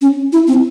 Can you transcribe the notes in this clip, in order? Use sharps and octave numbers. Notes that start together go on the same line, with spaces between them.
C#4
E4
C4